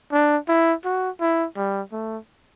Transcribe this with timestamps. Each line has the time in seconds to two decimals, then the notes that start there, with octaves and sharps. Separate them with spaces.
0.12 D4
0.48 E4
0.85 F#4
1.21 E4
1.56 G3
1.92 A3